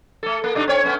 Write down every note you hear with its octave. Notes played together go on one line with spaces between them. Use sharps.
A3 A4
A#3
B2 D4 D#4
C4 C#5
A3 B3 C#4